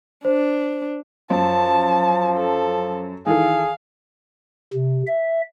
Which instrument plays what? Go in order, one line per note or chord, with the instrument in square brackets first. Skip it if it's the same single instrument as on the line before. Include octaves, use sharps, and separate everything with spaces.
[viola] D4 [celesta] C5
[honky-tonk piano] F#2 [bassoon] F3 [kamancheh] A5
[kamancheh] A4
[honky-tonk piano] D#3 E3 A4 [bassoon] G#4 [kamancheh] F5
[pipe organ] C3
E5